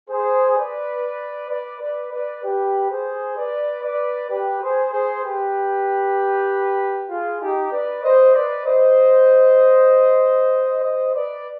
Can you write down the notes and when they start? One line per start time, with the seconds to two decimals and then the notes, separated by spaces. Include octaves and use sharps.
0.10 G#4 C5
0.56 B4 D5
1.50 B4 D5
1.80 B4 D5
2.13 B4 D5
2.43 G4 B4
2.90 G#4 C5
3.37 B4 D5
3.83 B4 D5
4.30 G4 B4
4.61 G#4 C5
4.92 G#4 C5
5.23 G4 B4
7.10 F4 G#4
7.41 D#4 G4
7.72 B4 D5
8.04 C5 D#5
8.34 B4 D5
8.65 C5 D#5
10.83 C5 D#5
11.14 B4 D5